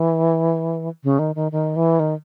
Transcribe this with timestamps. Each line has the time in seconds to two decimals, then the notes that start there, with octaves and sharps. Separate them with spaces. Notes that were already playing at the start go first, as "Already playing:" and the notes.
Already playing: E3
1.04 C#3
1.19 D#3
1.35 D#3
1.52 D#3
1.76 E3
2.00 D#3